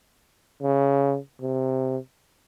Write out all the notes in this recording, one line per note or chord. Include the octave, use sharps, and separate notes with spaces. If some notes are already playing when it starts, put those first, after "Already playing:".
C#3
C3